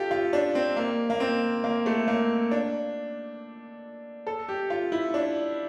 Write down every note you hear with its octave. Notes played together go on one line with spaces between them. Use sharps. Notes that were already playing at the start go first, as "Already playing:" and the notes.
Already playing: F4 G4 A4
F4
D4
C4
A#3
A#3
C4
A#3
A3
A#3
D4
A4
G4
F4
E4
D4